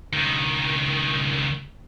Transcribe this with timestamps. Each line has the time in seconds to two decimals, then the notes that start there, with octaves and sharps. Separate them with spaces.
0.13 C#2 D#3